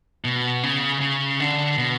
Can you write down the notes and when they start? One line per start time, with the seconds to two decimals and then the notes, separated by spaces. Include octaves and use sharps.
0.24 B2
0.63 C#3
1.01 C#3
1.40 D3
1.78 B2